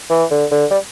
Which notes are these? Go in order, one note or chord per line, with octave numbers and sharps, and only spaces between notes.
E3
D3
D3
G3